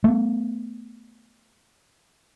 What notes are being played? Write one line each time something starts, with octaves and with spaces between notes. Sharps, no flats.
A3 B3